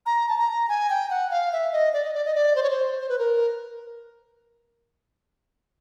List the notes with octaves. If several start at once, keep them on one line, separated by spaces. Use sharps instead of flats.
A#5
A5
A#5
G#5
G5
F#5
F5
E5
D#5
D5
D#5
D5
D#5
D5
C5
C#5
C5
C5
B4
A#4